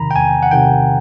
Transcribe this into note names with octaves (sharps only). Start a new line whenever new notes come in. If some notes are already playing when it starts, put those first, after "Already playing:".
Already playing: E2 C3 D#3 A#5 B5
G5
E2 G#5
F#5
C3 D#3 G5